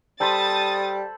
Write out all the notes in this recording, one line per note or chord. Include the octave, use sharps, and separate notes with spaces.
G3 A4 C5 A5 B5 D#6 A6